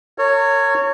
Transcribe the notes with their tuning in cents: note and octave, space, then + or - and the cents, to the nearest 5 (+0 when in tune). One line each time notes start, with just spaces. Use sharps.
A#4 -40 C#5 +0